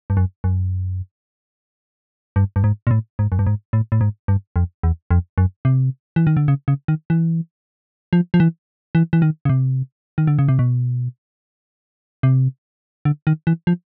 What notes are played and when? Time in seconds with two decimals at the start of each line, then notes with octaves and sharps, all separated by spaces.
0.10 G2
0.17 F#2
0.44 F#2
2.36 G2
2.56 G2
2.64 G#2
2.87 A#2
2.91 A2
3.19 G#2
3.32 F#2
3.39 G2
3.47 G#2
3.73 A2
3.92 A2
4.01 G#2
4.28 G2
4.56 F2
4.83 E2
5.11 F2
5.38 F#2
5.65 C3
6.16 E3
6.27 D#3
6.37 D3
6.48 C#3
6.68 C#3
6.88 D#3
7.10 E3
8.13 F3
8.34 F3
8.40 E3
8.95 E3
9.13 E3
9.22 D#3
9.45 C#3
9.49 C3
10.18 D#3
10.27 D3
10.39 C#3
10.49 C3
10.59 B2
12.23 C3
13.05 D3
13.27 D#3
13.47 E3
13.67 F3